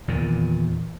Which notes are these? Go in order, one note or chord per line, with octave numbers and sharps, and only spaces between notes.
E2 A#2 D#3